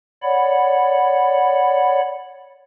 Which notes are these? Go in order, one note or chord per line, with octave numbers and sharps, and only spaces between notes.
C#5 D5 F#5 B5